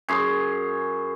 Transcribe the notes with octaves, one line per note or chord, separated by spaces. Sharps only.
F#2 G#4 C6